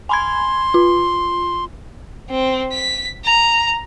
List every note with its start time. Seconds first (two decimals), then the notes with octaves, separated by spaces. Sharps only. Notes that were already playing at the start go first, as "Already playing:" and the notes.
0.09 G#5 B5 C6 G#6
0.74 F4
2.31 C4
2.72 B6
3.25 A#5